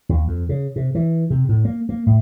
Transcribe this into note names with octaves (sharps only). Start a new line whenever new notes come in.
D#2
F2
C#3
C3
E3
C3
A2
A#3
A#3
A2